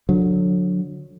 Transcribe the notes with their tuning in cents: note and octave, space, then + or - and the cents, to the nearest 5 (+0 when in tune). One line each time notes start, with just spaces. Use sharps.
D3 +0 F#3 -30